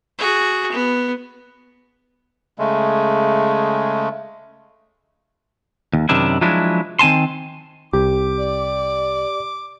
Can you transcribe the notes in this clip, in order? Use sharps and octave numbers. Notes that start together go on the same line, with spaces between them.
F#4 G#4
B3
C#3 G#3 A3
D#2
F#2 C3 D#3 D4 E4
F3 F#3 G#3 D4 E4
D#3 C4 G#5 A5 C6
C2 G4 D6
D5